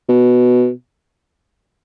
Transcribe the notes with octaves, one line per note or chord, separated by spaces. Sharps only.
B2